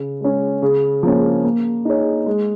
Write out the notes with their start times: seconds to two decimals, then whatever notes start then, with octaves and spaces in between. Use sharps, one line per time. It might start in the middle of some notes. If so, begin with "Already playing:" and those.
Already playing: C#3
0.21 G#3 C#4
0.62 C#3
1.03 F3 A#3 C#4
1.44 A#3
1.85 D#4 G#4 C#5
2.26 G#3